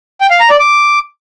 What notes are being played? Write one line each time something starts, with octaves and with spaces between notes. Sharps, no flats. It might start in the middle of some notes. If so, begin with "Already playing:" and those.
G5
F5
A#5
D5
D6